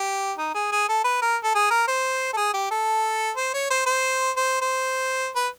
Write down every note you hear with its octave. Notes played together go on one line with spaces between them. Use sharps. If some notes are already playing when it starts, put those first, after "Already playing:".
Already playing: G4
D#4
G#4
G#4
A4
B4
A#4
A4
G#4
A#4
C5
A4
G#4
G4
A4
C5
C#5
C5
C5
C5
C5
B4